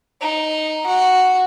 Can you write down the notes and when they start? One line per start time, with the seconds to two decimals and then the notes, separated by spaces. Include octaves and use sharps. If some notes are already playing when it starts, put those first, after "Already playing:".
0.21 D#4
0.87 F#4